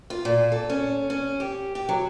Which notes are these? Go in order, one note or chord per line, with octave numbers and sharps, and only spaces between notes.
F4
A#2
A4
C#4
C#4
G4
G4
F#3